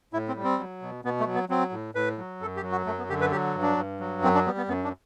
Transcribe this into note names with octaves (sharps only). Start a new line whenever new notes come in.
A2 E4
C4
G3
C4
F#3
B2
B2 B3
A3
F#3
B3
F#3 C4
A2
A2 B4
F#3
F#2 A4
G4
F#3
F#4
F#2 A3
B3
D3 G4
B4
F#3 G4
G2
D4
G2
F#3
F#2 C4
D4
G3 B3
B3
F#2 B3
D4